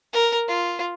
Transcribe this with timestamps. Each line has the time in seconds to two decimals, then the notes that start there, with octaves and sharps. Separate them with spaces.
0.13 A#4
0.48 F4